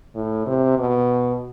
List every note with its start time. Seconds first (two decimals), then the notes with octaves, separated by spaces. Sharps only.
0.15 A2
0.46 C3
0.78 B2